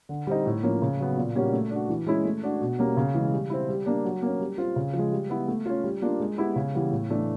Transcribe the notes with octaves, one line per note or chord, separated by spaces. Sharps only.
D3
G3 C4 D#4
A2
F3 A#3 C#4
C#3
F#3 B3
A#2
G3 A#3 C#4 F#4
A3
D4 F#4
E3
G#3 C#4 E4
A3
D4 F#4
B2
G3 A#3 C#4
C#3
E3 G#3
G3
C4 E4
G3
A#3 D4
F#3
A#3 C#4
G3
C4 F4
C#3
F3
G#3
G3
B3 E4
A3
C#4 F4
G3
A#3 D4 F4
G#3
B3 E4 G4
C#3
E3 G3 B3
A2
E3 A3 D4